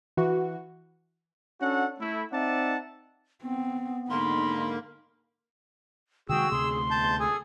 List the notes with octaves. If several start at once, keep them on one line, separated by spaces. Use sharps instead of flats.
E3 F#4
C#4 D4 F#4 A4 F#5
A3 E4
C4 D#4 D5 E5 F#5 A5
B3 C4
G#2 D3 A#3 D#4 B5 C6
C3 D#3 G#3 F#4 G#4 G5 E6
D2 C3 A3 G#4 C6
E2 A5 G6
G#4 A4 G#5 D#6